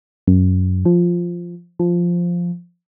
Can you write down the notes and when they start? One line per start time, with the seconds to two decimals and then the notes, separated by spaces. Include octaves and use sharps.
0.27 F#2
0.85 F3
1.79 F3